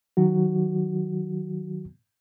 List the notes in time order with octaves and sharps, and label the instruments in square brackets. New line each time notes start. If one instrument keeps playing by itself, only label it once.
[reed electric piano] D#3 F#3 F#4